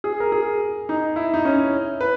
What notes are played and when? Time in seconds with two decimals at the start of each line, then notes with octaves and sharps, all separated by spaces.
0.04 G#4
0.20 A#4
0.32 G#4
0.89 D#4
1.16 E4
1.34 D#4
1.45 C#4
2.01 B4